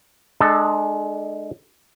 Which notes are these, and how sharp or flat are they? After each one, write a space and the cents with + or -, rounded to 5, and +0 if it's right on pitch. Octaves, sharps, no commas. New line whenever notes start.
G#3 +20 D4 +40 A4 +0